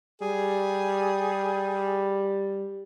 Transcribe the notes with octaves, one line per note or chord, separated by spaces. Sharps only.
G3 G#4